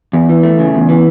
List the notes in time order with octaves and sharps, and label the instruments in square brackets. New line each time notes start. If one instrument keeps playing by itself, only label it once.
[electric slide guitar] E2
E3
A3
C#3
E2
E3